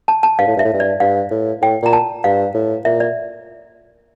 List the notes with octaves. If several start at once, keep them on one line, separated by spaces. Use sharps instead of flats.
A5
A5
G2 F5
A2
G2 E5
A2
G2
D5
G2 F5
A2
A2 G5
A#2 A#5
A5
G2 F5
A2
A#2 E5
D5